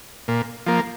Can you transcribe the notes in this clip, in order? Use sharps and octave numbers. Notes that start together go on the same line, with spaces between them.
A#2
F3 A#3